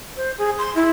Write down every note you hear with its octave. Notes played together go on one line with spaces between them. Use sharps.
C5
G#4
C6
E4